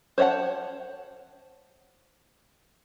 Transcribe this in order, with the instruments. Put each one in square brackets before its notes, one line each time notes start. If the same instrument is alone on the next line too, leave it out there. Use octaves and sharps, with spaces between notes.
[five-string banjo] C5 C#5 D#5 F#5 A5